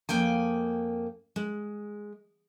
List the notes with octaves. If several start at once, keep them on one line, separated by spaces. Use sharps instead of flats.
F2 A#3 G5 G#5
G#3